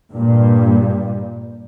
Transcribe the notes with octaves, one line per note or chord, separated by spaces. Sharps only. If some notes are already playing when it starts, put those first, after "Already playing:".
G2 A#2 G3